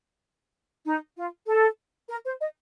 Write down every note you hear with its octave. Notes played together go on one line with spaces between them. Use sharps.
D#4
F4
A4
A#4
C5
D#5